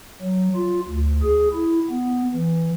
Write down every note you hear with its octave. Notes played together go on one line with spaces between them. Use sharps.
F#3
F4
D2
G#4
E4
B3
E3